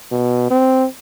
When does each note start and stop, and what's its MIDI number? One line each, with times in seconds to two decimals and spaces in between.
0.12 0.48 47
0.51 0.86 60